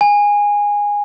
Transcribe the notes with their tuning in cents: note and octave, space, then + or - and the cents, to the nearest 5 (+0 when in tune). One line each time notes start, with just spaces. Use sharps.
G#5 -15